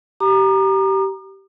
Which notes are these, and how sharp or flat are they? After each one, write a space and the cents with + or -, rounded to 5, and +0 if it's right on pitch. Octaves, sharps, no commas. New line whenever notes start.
G4 -20 A#5 +10 D6 +45